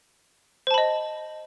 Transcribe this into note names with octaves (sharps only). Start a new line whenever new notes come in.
C5 D#5 A5 B5